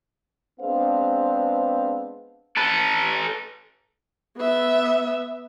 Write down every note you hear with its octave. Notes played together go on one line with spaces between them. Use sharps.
G#3 B3 C4 D4 C5 F5
A4 B4
B3 E5